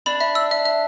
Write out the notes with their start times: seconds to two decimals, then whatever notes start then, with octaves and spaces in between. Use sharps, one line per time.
0.06 D4 B5
0.20 E5
0.35 E6
0.51 E5
0.65 E5